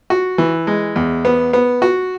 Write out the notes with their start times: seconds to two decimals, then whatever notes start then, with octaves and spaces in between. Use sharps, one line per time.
0.10 F#4
0.38 E3
0.67 G#3
0.96 E2
1.25 B3
1.53 B3
1.82 F#4